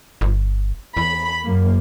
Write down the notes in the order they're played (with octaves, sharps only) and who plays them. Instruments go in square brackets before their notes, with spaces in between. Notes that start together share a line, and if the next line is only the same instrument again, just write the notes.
[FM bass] G1
[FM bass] E2 [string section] B5
[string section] F#2 A#3